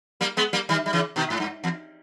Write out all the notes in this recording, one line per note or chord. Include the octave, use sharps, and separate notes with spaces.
G3 A#3
G#3 B3
G3 A#3
D#3 G3
G3
C#3 E3
B2 D#3
G#2
G2
E2